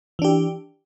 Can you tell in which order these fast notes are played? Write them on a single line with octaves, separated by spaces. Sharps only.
E3 D4 G4